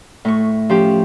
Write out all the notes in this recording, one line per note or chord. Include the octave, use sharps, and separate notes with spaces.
A2 C#6
F3 C#4 G4